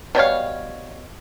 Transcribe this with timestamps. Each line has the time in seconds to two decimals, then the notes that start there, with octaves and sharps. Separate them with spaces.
0.15 B2 G3 C#5 F5